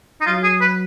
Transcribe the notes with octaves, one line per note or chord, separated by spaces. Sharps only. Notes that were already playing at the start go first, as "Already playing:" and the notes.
D#4
F#3 F4
G#4
B4